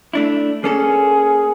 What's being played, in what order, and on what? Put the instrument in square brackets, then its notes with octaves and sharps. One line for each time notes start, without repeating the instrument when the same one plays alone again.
[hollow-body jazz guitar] A3 D4 E4
[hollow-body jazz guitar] A#3 C#4 A4 [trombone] G#4